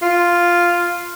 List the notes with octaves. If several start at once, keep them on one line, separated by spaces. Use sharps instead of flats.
F4